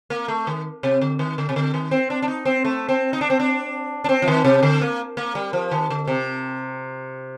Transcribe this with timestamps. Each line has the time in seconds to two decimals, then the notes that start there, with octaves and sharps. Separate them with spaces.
0.10 A#3
0.28 A3
0.47 D#3
0.83 C3
1.01 D3
1.19 D#3
1.38 D3
1.49 C3
1.56 D3
1.74 D#3
1.91 C4
2.10 D4
2.22 D4
2.28 D#4
2.45 C4
2.65 A3
2.89 C4
3.13 D#4
3.21 D4
3.30 C4
3.39 D4
4.04 D4
4.09 C4
4.22 F3
4.28 D#3
4.45 C3
4.63 D3
4.81 A#3
5.17 A#3
5.35 G3
5.53 F3
5.71 D#3
5.90 D3
6.07 C3